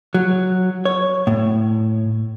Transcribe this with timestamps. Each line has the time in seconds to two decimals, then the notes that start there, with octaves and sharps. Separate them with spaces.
0.14 F#3
0.85 C#5
1.27 A2